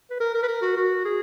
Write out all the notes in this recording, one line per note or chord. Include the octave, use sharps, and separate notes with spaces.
B4
A#4
A#4
B4
A#4
F#4
F#4
G#4